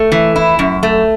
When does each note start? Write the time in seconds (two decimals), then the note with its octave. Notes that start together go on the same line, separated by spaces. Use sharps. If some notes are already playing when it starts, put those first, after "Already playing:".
Already playing: A3
0.12 E3
0.36 E4
0.59 F#2
0.83 A3